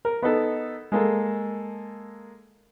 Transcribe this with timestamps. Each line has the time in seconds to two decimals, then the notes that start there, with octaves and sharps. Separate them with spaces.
0.05 A#4
0.22 B3 D#4 A4
0.92 G#3 A#3 A4